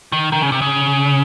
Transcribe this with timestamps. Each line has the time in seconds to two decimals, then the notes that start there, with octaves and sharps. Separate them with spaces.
0.12 D#3
0.32 D#3
0.42 C#3
0.52 C3
0.62 C#3